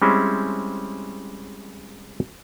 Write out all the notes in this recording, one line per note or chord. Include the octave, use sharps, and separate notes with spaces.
G3 G#3 C4 C#4 E4